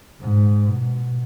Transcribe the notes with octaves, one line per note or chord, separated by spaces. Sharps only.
G#2
B2